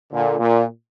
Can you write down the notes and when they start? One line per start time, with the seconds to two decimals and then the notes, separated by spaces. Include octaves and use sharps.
0.11 A#2 D3
0.40 A#2